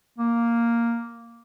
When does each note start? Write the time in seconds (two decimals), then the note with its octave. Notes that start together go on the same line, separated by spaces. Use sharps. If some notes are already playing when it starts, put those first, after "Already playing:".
0.18 A#3